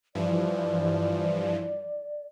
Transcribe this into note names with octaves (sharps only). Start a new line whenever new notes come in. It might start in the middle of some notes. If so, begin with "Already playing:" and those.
G2 E3 F3 D5